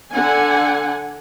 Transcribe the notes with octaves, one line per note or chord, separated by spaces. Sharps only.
D3 F#5 G#5